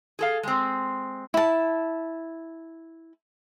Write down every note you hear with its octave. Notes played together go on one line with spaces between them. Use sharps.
G#4 A4 F5
G#3 C4
E4 A5